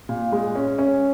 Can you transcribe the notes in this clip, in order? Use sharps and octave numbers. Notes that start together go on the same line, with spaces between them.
A#2
G#3
C#4
C#4